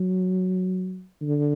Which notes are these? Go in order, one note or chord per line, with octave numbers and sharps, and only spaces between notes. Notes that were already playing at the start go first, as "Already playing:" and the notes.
Already playing: F#3
D3